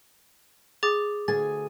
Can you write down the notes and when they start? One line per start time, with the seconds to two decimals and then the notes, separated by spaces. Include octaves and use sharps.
0.83 G#4 D6 A6
1.28 D2 G#4 G#5 A6